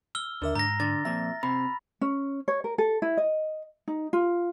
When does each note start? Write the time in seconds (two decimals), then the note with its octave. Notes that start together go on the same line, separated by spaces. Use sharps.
0.15 E6 F6 G7
0.42 D#2 D3 A#4 E5
0.55 G#2 A#5 A#6
0.80 D3 A6
1.05 F2 A#2 E5
1.43 C3 B5
2.01 C#4
2.48 C#5
2.64 A#4
2.78 A4
3.02 E4
3.17 D#5
3.88 D#4
4.13 F4